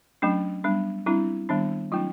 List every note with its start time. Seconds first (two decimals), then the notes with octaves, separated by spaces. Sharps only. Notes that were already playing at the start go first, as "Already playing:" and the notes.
0.22 F#3 A3 C#4 D4
0.64 G3 B3 D4
1.06 G3 C4 D4 E4
1.49 D#3 G3 B3 D4
1.92 F#3 A3 C#4 D#4 F4